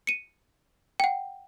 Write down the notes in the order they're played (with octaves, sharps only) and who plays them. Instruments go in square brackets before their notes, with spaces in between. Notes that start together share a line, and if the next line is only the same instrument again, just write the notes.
[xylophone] C#7 D#7
F#5 G5